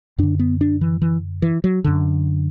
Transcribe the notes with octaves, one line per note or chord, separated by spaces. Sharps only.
F#2 D3 D4
B3
D4
E3
E3
E3
F#3
F#2 D3